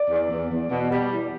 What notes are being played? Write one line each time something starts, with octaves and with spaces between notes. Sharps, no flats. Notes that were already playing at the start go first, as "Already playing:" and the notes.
Already playing: D5
E2
E2
E2
B2
G3
E2